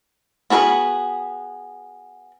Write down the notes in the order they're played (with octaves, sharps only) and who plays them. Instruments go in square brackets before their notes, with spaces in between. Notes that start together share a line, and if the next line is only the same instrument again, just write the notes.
[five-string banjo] B3 F#4 G#4 A#4 B4